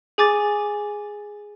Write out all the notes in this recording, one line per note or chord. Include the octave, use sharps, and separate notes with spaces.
G#4 G#5 D6 A6